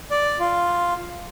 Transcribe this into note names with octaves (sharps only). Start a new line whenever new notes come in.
D5
F4